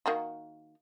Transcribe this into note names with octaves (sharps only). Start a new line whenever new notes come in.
D#3 A#3 F#4